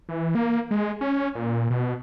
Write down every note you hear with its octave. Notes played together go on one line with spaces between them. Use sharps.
E3
A#3
G#3
C#4
A#2
B2